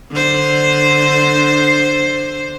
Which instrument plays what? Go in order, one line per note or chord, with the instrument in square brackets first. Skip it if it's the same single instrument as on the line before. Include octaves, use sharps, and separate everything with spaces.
[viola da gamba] D3 C5